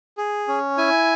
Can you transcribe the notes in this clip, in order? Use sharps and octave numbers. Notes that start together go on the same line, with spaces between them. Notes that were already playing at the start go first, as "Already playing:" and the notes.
G#4
C#4
E4 G#5